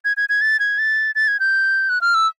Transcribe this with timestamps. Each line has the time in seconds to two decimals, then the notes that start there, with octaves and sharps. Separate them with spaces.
0.05 G#6
0.17 G#6
0.29 G#6
0.41 A6
0.60 G#6
0.78 A6
1.15 A6
1.28 G#6
1.40 G6
1.89 F#6
2.01 F6
2.15 E6